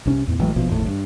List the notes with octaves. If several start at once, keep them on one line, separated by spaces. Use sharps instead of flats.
C2 C3 C#4
E2 A2
A1 E3 F#3 G#3
A#1 B2 F3
G#1 E2 A2
G2